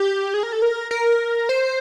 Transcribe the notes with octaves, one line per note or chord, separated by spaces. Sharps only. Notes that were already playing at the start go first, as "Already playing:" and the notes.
Already playing: G4
G#4
A#4
A4
A#4
A#4
C5